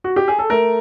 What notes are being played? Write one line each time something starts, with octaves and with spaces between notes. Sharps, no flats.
F#4
G4
G#4
A4
A3 A#4